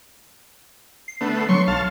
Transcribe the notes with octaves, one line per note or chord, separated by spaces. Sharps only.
C7
D3 A3 B3
F#3 C6 C#6
B1 F5 A5